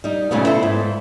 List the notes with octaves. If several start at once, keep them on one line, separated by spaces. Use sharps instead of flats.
G3 D#4
A#2 C#3 G3 A3 B3
E4 A4 C5 E5
G#2